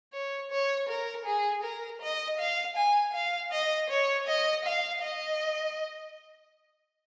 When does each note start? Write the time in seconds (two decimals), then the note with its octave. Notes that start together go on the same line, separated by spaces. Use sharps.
0.13 C#5
0.51 C#5
0.88 A#4
1.25 G#4
1.63 A#4
2.01 D#5
2.39 F5
2.76 G#5
3.13 F5
3.52 D#5
3.90 C#5
4.27 D#5
4.65 F5
5.02 D#5